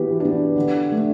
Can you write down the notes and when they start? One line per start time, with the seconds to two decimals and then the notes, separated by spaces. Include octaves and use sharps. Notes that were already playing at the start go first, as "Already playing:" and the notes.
Already playing: E3 B3 F#4 G4
0.20 B3 D4
0.56 D3
0.92 A3 D4